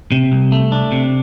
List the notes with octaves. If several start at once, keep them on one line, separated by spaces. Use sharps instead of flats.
C3
C2
A3
D4
C3